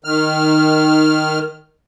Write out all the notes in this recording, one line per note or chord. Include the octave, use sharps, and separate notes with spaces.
D#3 F6